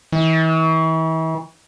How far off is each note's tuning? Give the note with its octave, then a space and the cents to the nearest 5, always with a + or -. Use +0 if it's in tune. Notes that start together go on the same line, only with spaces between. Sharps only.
E3 -40